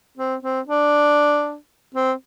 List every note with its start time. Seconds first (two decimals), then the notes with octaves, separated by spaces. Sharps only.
0.17 C4
0.43 C4
0.68 D4
1.95 C4